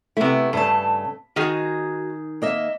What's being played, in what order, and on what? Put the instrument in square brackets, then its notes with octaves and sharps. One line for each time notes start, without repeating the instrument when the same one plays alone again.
[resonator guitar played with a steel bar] C3 E4 [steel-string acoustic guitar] A3 B3
[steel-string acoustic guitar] G2 C#3 A5 [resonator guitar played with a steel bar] A3
[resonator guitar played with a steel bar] D#3 D#4 G#4 [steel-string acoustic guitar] F#4
[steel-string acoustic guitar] A#3 D#5 E5